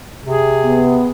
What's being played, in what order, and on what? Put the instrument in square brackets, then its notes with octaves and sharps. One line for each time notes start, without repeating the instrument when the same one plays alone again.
[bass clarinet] C3 [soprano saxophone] G#4
[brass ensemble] B3